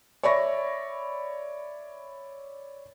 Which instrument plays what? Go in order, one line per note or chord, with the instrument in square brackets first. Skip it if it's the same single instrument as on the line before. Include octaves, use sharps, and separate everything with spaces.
[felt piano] C#5 D5 E5 B5 C#6 A#6